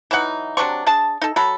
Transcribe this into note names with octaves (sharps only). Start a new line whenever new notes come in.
E3 F#3 D#4 F#5
C3 F#3 D4 C#6
D4 G#4 A5
D#4 A4
F#3 A4 B5